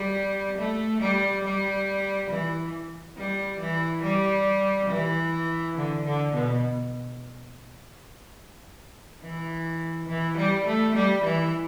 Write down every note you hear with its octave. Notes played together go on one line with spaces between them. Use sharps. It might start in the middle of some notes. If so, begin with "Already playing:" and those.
Already playing: G3
A3
G3
G3
E3
G3
E3
G3
E3
D3
D3
B2
E3
E3
G3
A3
G3
E3